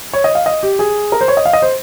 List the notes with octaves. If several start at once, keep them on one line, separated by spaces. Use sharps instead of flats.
C#5
D#5
F5
D#5
G4
G#4
A#4
C5
C#5
D#5
F5
D#5
C5